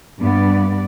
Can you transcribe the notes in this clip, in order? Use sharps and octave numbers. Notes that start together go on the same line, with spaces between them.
G2 B3 D5